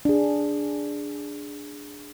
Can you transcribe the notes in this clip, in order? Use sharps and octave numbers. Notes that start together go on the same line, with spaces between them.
D4 G#4